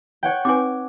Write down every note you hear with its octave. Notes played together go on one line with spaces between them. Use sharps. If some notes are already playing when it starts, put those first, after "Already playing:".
C#5 F#5 G5
C4 D#4 B4 G#5 D6